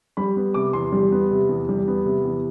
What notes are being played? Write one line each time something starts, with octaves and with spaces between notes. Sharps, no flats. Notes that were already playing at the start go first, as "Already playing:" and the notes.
G3 B5
B3
C3 D6
E2 C6
G3
B3
C3
E2
G3
B3
C3
E2